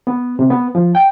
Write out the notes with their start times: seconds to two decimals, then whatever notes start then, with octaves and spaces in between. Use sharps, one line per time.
0.07 B3
0.39 C3
0.50 B3
0.75 F3
0.95 G5